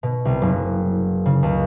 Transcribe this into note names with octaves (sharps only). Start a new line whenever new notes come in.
B2
C2
F#1
C#3
C#2